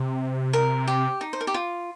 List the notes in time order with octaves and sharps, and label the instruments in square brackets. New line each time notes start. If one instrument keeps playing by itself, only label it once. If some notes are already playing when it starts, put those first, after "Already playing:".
Already playing: [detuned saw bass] C3
[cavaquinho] A#4
G4
D#4
C5
A#4
G4
F4